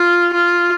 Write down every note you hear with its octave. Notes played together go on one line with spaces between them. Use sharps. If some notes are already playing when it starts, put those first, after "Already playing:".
Already playing: F4
F4